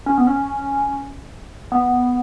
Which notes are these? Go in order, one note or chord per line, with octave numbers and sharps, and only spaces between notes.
C#4
B3
C#4
B3